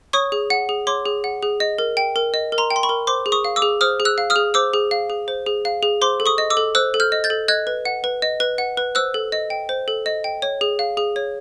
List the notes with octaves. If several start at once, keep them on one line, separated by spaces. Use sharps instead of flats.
C#5 C#6 D#6
G#4
F#5
G#4
C#5 C6 D6
G#4
F#5
G#4
D#5
A#4
G5
A#4
D#5
A#4
A#5 C6
G5
C6
B5 C#6
A#4
C5 C6 D6
G#4
C#6 D#6
F5
D6 E6
G#4
C5 D#6 F6
G#4
E6 F#6
F5
D#6 F6
G#4
C5 D6 E6
G#4
F5
G#4
C5
G#4
F5
G#4
C5 C6 D6
A4
C#6 D#6
D#5
D6 E6
A4
C5 E6 F#6
A4
F6 G6
D#5
G6 A6
A4
D#5 F#6 G#6
B4
F#5
B4
D#5
B4
F#5
B4
C5 E6 F#6
A4
D#5
G5
C5
A4
D#5
G5
C#5
G#4
F5
G#4
C#5